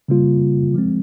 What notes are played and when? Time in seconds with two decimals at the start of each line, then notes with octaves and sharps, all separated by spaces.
0.08 C#3 G3 A#3 F4
0.74 F3 G#3 C4